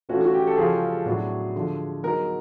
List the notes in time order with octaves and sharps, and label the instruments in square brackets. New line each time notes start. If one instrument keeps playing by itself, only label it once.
[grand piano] E3 A3 C#4 F4 A4 [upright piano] F#4
[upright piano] F#4
G4
A4
[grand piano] C#3 F3 G#3 C#4 F4 [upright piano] G#4
[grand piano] A2 F#3 B3 D4 F#4
D3 F3 G#3
[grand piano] F#3 B3 D#4 G#4 [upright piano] A#4